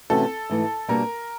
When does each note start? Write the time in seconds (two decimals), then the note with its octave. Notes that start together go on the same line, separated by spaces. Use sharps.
0.10 C3 E3 A3 C#4 F#4 A4
0.50 G#2 E3 A3
0.88 B2 G3 A#3 D4 A#4